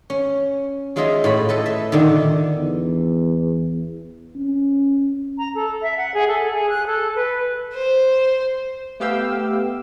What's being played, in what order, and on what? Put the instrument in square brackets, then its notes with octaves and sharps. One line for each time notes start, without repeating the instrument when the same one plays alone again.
[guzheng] C#4
F#3 G#3 F4 G#4 D#5 E5
A2 F4 B5
A4 B4 D#5
E5
A#2 D3 D#3
[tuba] E2
C#4
[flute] A#5
A4
E5
F#5
G#4
A4
G#4
F#6
A4
B4
[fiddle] C5
[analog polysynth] A3 B3 G4 F5 G5 E6